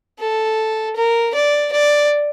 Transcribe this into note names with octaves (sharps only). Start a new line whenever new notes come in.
A4
A#4
D5
D5